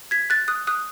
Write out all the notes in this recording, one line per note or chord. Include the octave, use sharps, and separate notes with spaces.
G#6 B6
F#6 A6
D#6 F#6
D#6 F#6